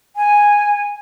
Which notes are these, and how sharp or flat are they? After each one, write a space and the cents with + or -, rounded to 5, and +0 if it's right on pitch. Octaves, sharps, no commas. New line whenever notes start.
G#5 -5